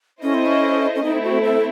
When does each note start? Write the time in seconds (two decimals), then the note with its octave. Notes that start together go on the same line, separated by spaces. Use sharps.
0.23 C#4 E4 A4 C5 D#5
0.34 C4
0.46 C#4
0.96 C#4
1.04 A3 C4 D#4 E4
1.24 F#4
1.44 A4